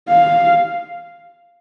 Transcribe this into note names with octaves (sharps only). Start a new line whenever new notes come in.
F5